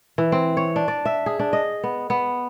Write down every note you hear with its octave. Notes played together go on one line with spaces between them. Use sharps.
E3
C4
C#5
D4
D5
E5
G#4
D4
D#5
B3
B3